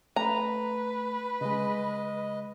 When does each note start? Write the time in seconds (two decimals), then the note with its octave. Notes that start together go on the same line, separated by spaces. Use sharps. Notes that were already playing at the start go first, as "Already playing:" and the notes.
0.16 A3 B4 A#5
1.41 C#3 G#3 D#5